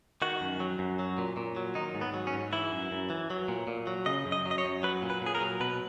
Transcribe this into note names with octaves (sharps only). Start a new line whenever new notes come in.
D#3 F#4
F#2
F#3
F#2
F#3
A#2
A#2
F#3
D#3 D#4
G#2
B3
F#3
C#4
G#2
E3 E4
F#2
F#2
E3
F#3
A#2
A#2
F#3
C#3 D#5
F#2
D#5
F#3
D#5
C#5
F#2
F#3 B4
A#2
B4
A#2 G#4
A#4
F#3
B2 B4